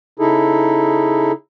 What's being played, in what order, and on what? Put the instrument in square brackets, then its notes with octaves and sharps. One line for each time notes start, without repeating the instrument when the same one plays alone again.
[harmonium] C#3 D#4 E4 G#4 A4